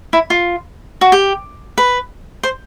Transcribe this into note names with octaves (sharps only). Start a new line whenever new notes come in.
E4
F4
F#4
G4
B4
C5